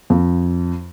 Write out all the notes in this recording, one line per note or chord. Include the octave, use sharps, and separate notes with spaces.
F2